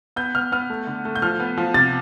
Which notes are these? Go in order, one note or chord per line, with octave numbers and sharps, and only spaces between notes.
B3 G6
B3 F6
B3 F6
A3
D3
A3
G6
F3 F6
B3
F3
C3 A6